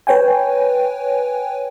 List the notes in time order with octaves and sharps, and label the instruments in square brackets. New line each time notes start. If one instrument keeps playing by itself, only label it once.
[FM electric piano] B4 C#5 G5 G#5